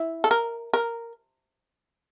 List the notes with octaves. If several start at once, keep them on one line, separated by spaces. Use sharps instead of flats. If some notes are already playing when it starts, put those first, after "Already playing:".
Already playing: E4
A4
A#4
A#4